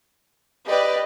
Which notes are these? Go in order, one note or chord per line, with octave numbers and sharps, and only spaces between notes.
G4 B4 D5 D#5